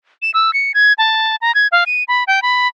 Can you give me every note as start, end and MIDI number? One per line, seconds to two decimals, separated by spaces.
0.22 0.31 100
0.34 0.53 88
0.53 0.72 97
0.74 0.93 92
0.98 1.36 81
1.42 1.54 82
1.55 1.67 92
1.72 1.84 77
1.86 2.04 99
2.08 2.24 83
2.27 2.42 79
2.42 2.68 83